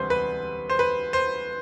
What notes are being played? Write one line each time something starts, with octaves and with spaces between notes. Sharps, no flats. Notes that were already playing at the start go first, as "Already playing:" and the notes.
Already playing: E1 D2 C3 G3 B4 C5
B4
C5
B4
C5